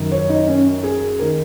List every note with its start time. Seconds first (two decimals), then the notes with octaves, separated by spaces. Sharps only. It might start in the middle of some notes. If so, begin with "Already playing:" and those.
Already playing: F#2 D#3
0.12 C#5
0.29 D#4
0.48 C#4
0.83 G#4
1.19 D#3 A#4